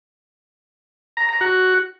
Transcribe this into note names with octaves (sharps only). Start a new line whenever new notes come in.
A#5
A#5
F#4